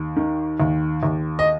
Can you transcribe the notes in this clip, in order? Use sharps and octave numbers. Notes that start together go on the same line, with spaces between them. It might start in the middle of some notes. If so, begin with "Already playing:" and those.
Already playing: D#2
D#3
D#2
D#2
D#5